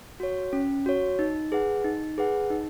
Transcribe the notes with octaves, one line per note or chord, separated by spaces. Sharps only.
F#4 C#5
C#4
F#4 C#5
D#4
G#4 B4 F#5
D#4
G#4 B4 F#5
D#4